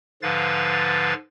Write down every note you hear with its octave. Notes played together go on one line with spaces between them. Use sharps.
G#2 D3 F3 B4 F5 A6